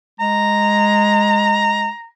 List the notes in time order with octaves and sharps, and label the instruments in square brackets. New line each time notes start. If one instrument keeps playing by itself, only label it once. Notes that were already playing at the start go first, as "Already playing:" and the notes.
[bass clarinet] G#3 [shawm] A#5